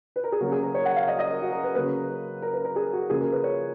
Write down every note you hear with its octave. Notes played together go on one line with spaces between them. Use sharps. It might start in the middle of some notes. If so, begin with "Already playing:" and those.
B4
A#4
G#4
C#3 F#3 A#3 F#4
G#4
A#4
C#5
F#5
F5
D#5
D#5
A#4
F#4
A#4
B4
C#3 F#3 A#3 B4
A#4
B4
A#4
G#4
F#4
C#3 F3 A#3 G#4
A#4
B4
C#5